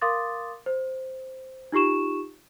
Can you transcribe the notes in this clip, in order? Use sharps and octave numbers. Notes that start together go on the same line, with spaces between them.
A#4 F5 C6 D6 D#6 A6
C5
D#4 F4 G4 C#6 E7